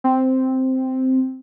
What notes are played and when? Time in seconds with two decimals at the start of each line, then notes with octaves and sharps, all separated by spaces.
0.04 C4